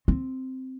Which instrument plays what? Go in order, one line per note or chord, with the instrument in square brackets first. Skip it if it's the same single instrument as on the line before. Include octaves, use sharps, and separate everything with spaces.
[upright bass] C4